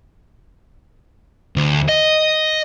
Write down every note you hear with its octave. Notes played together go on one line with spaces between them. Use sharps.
D2
D#5